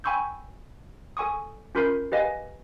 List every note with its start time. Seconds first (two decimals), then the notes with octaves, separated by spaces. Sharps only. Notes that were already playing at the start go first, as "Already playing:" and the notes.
0.04 G5 G#5 B5 C#6 E6 G6
1.17 A4 G#5 C#6 D#6
1.75 C#4 F4 A#4 B5 G6 C7
2.12 G4 B4 D#5 F5 G#5